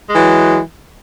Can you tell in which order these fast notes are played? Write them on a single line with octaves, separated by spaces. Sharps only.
G#3 E3 F#3